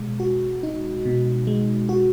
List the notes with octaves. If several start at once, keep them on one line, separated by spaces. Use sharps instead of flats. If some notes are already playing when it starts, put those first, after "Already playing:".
Already playing: B2 G#3
F#4
D#4
B2
G#3
F#4